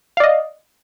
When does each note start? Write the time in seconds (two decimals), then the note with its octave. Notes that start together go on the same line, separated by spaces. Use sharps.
0.17 F5
0.20 D5
0.24 D#5